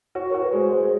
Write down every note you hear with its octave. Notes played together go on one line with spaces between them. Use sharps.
F#4 C#5
F#4 A#4
B4
G#3 C5
G#3